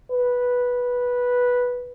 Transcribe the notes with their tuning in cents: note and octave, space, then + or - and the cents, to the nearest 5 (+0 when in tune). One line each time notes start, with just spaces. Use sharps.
B4 -10